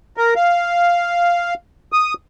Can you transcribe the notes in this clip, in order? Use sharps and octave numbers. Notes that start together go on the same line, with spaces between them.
A#4
F5
D#6